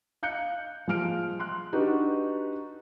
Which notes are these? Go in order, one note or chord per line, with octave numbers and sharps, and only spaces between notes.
F5 F#6 G6 C#7
F3 G#3 F6 D7
C6 F#6
D4 D#4 F#4 G4 B4